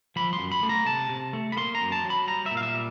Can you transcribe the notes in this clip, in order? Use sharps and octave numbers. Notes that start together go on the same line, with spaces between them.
F3 B5
C6
F#2
B5
A3
A#5
C3 A5
C3
A3
B5
A#3 C6
A#5
F#2
A5
F#3
B5
G3 A#5
A#2 E5
F5
E5
G3